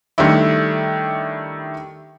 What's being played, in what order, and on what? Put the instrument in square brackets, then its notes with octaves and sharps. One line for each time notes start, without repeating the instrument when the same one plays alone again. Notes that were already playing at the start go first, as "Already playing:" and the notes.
[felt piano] D#3 G3 A3 D4 E4